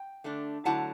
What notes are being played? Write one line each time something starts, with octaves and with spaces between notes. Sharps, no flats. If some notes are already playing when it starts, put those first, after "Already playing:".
Already playing: G5
D3 A3 D4
D3 F#3 A3 E4 F#5 A5